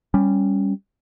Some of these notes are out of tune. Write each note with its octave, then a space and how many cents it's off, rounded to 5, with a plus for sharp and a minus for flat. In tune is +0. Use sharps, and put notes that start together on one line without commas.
G3 +10 C#4 +0